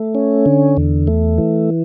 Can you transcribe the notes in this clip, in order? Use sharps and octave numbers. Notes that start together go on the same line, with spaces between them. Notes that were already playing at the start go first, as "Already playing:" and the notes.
Already playing: A3
C#4
D3
E2
A3
E3